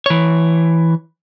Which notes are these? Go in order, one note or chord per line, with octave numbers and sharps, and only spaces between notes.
E3 C#5